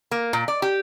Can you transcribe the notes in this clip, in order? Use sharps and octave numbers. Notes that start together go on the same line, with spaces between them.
A#3
A#2
D5
G4